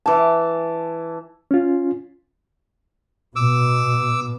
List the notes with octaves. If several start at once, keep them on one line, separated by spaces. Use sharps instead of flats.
E3 A5
C#4 F4
B2 D6 E6